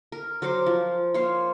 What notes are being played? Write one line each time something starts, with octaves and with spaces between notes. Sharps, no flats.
A#4
F#3 A#4 C5 D6
F3
A#3 C5 C#5 F5